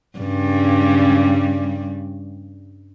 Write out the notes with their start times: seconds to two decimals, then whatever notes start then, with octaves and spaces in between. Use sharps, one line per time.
0.18 G2 C#3 G3